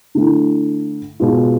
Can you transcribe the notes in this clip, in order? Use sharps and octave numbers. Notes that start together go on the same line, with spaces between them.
D3 A3 E4
B2 G#3 B3 F4